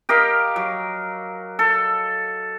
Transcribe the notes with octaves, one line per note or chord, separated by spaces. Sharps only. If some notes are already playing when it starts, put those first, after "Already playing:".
G4 A#4 D#5 F5
F#3
A4